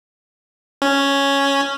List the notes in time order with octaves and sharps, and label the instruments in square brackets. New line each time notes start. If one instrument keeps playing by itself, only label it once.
[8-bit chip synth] C#4